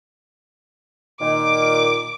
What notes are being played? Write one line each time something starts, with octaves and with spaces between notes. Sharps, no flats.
A#2 D#3 D6